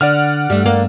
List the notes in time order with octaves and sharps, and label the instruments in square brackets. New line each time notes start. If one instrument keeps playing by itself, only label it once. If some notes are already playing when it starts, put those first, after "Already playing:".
[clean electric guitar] D3 [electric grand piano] D5 F#5 F6
[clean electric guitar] G2 A3 [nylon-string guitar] G3
[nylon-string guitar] A#3